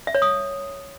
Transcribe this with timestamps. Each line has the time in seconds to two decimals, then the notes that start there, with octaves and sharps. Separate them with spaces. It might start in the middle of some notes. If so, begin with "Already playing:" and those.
0.07 E5
0.15 C#5
0.22 D#6